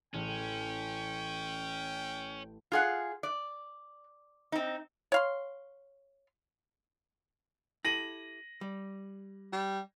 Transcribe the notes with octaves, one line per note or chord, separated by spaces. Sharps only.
A1 C#4 G5
F4 G#4 F#5
D5
C4 D#4
C#5 F5 C6
E4 G4 A4 A#6 D#7 F#7
G3
G3